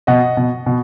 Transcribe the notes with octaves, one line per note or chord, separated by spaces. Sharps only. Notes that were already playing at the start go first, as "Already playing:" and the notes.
B2 D#5 F#5
B2
B2